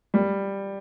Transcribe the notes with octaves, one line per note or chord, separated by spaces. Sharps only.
G3